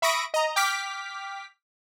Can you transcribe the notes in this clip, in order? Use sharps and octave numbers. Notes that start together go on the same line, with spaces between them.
E5 B5 C#6 D#6 A#6 D7
D#5 A#5
G5 D6 F6 B6